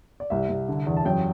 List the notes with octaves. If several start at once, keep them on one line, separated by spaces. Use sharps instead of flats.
D5
C2 E5
C2
D3
E2
A5
F#2 G5